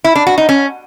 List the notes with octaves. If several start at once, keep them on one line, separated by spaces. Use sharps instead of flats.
E4
D4
F#4
D#4
C#4